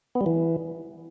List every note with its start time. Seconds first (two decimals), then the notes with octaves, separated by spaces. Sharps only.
0.15 B3
0.21 G3
0.26 E3